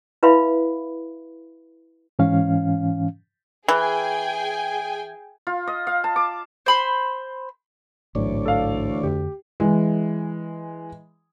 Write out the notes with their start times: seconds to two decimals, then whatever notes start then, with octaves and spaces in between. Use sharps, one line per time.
0.23 E4 B4 E5 F5 B5 C6
2.19 G#2 E3 C#4 F5
3.68 E3 G#4 G5 G#5
5.47 F4
5.67 D#5
5.87 F5
6.04 A5
6.16 D6
6.66 C5 B5 C6
8.15 A1 D2 G#2 E3 F#3 C#5 D5
8.46 A4 F5
9.03 F2 D3 G4
9.60 E3 G#3